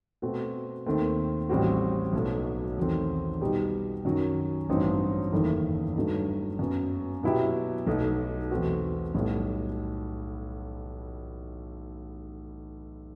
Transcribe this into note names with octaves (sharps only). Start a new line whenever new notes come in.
B2 A3 C4 F#4
D#2 D#3 A3 C4
A1 A2 G3 C4 F#4
B1 B2 F#3 A3
E2 D#3 F#3 A3 C4
B2 G3 D#4 G4
F#2 D#3 F#3
A1 G2 F#3 C4 D#4
F#1 E2 D#3 A3 E4
G2 F#3 A3 D#4
F#2 F#3 B3
B2 F#3 B3 E4 G4
B1 B2 A3 D#4
E2 B2 A3 C4 F#4
B1 A2 G3 B3